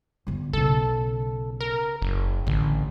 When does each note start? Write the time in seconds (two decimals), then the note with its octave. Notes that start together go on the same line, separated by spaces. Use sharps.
0.27 G1 D3
0.53 B1 C#3 A4
1.60 A#4
2.02 F#1
2.47 A1 D3